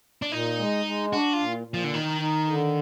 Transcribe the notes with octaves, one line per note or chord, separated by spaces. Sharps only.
D4
A#2 D#4
G#3
G#3
D4 F#4
F4
A#2
A#2
F3
D3
D#3 D#4
D#4
D3